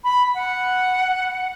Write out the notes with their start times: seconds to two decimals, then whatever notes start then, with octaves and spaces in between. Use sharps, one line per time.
0.04 B5
0.34 F#5